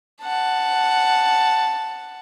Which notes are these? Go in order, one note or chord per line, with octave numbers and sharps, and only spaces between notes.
F#5 A5